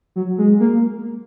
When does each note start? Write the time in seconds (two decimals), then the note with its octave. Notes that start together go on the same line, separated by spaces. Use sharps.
0.16 F#3
0.38 G#3
0.60 A#3